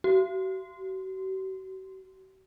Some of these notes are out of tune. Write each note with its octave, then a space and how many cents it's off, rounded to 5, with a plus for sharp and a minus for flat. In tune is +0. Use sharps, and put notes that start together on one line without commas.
F#4 +45